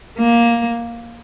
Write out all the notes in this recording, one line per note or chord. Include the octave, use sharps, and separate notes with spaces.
A#3